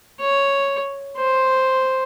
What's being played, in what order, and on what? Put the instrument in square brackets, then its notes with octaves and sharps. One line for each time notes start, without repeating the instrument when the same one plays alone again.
[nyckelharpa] C#5
C5